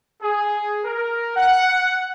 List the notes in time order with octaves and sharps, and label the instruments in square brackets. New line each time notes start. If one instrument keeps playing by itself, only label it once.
[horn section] G#4
A#4
F#5